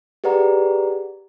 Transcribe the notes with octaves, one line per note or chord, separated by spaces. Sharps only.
G4 G#4 B4 D5 F#5 A#5